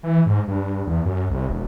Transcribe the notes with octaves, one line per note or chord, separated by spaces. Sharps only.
E3
G#2
G2
E2
F#2
C2
E1